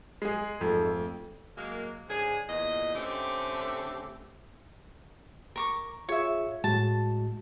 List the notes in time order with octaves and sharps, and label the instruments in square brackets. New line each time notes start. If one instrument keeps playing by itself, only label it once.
[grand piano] G#3 G#4
[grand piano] F2 [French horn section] G#2 A3 A4
[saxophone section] F#3 G#3 A#3
G#2 C#3 D4 G#4
E2 A#2 D#5
D3 A3 C4 C#4 G4
[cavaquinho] A#4 C#6 D6
[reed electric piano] F4 G#4 F5 [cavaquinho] C#5 E5
[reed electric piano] A2 G#3 F#4 [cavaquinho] A5